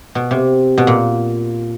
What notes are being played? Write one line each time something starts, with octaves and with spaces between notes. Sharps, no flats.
B2
C3
B2
A#2